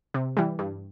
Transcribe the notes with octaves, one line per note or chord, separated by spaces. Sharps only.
C3
E3 G3
G2